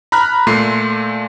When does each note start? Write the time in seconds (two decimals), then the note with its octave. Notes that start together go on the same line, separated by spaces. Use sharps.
0.12 A#5 B5 F6 F#6
0.47 A#2 A3 C6 C7